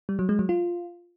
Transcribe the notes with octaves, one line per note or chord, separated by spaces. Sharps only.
G3
F#3
G#3
F#3
F4